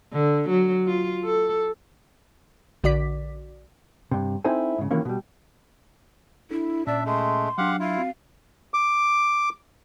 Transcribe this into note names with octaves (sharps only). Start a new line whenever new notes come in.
D3
F#3
F4
A4
A#1 D3 F#4 D5 D6 B6
G2 C3
C4 D#4 E4 A4 C5 G#5
G#2 C#3
C3 D#3 E3 F#3 A#3 C#4
B2 G3
D4 E4 A4
A#2 C#4 D4 D5 E5
G#3 A3 C6
F#3 D4 G4 F5 F#5
E4 F4 F5
C4 F#4
D6